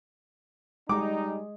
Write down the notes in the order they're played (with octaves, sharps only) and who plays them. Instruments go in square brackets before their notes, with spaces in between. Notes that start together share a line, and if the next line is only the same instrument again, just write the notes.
[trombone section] G3 D#4 [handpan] G#3 G#4 [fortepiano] D6